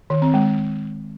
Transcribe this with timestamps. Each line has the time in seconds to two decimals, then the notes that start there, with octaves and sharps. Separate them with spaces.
0.10 D#3
0.22 C4
0.34 G#3